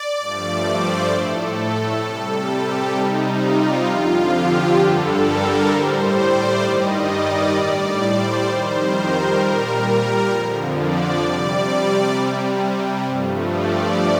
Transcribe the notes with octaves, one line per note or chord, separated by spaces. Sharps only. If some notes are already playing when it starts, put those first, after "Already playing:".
Already playing: D5
G2 F3 A3
C5
A2 A3 A4
C3 G3
G4
C3 G3 D#4
F4
F2 D3 F3 F4
G4
G2 D3 G3 A4
A#4
A2 G3 C5
D5
G2 D#3 G3 D#5
D5
A2 G3 D5
C5
F2 D#3 G3 C5
A#4
A#2 G3
A#4
F2 D3 F3
D5
C3 G3 D5
C3 G3
G2 F3 A3
D5